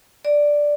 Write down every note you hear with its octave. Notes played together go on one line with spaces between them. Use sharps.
D5